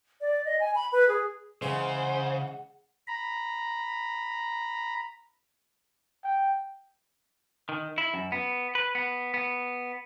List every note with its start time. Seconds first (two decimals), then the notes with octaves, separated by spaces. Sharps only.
0.21 D5
0.45 D#5
0.60 G#5
0.75 B5
0.92 B4
1.09 G#4
1.62 C#3 E3 G#3 C5 F#5
3.08 A#5 B5
6.24 G5
7.69 D#3
7.98 E4
8.14 F#2
8.32 B3
8.75 B4
8.95 B3
9.34 B3